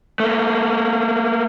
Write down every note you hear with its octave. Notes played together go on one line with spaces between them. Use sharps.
A3 A#3